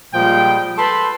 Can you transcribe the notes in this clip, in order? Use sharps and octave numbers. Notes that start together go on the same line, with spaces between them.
A#2 F3 G3 G#3 G5
A4 B4 A5 B5 C6